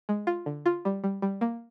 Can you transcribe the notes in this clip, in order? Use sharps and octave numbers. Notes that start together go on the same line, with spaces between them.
G#3
F4
D3
F4
G3
G3
G3
A#3